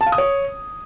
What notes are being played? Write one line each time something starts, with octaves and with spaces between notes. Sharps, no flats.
A5
F5
D#6
C#5